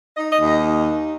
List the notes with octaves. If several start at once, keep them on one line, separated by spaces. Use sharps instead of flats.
D#4 D#5
D#5
D#2
D#5
D#4